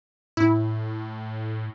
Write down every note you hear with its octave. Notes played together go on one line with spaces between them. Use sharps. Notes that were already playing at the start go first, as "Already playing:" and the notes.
A2 E4